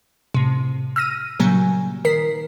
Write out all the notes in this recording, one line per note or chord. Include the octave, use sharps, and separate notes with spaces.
A2 C3
E6 F6 A#6 D#7
A#2 C#3 F#3 G3 A#3 G#5
D#3 A#4 B6 C7